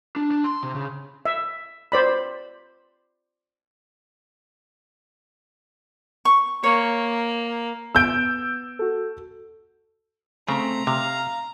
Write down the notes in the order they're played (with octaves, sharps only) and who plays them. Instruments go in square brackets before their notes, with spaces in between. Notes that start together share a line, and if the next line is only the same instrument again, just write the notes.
[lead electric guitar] D4
D4
C6
C3
C#3
[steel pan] E5
C5 D5 B5
[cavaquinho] C#6
[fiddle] A#3 [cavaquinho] C#5
[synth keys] B3 [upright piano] E6 G6 D7
[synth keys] F#4 A4
[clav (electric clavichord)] C#3 [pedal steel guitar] A3 C4 [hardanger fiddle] A#5
[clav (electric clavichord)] C3 [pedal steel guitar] F5